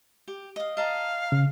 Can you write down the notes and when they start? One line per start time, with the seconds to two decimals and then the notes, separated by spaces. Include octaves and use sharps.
0.28 G4
0.56 D#5 F5
0.77 D#5 F5 A5 A#5
1.32 C#3